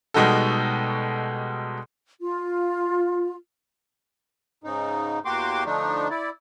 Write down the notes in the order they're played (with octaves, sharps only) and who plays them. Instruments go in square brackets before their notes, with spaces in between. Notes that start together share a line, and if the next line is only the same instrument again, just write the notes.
[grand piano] B2 G3 G#3 D#4 F#4 A4
[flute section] F4
[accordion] G#2 C#3 D#4
E2 A#3 F#4 G4 C6 D6
D3 F3 A3 D4 D#4
E4 D5